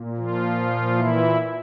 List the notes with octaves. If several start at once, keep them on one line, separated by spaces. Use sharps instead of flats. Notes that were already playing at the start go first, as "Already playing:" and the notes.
Already playing: A#2
F3 F4
E3 E4